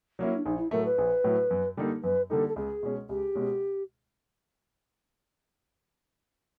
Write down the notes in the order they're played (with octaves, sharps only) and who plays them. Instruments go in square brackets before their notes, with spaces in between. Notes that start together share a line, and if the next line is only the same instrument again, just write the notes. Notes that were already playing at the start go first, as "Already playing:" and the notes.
[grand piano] F#3 A#3 C#4 E4
[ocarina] D4
[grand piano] A#1 [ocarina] D#4
[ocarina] E4
[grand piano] A2 F#3 A3 [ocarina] A#4
[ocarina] B4
[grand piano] A#1
A2 F#3 A3
F#2
D3 G3 A#3 D#4
[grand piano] F#2 [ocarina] B4
[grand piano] D3 G3 A#3 D#4 [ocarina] A4
[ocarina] A4
[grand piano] C#2 [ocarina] G#4
[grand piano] B2 G#3 C#4
[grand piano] C#2 [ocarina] G4
[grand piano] B2 G#3 C#4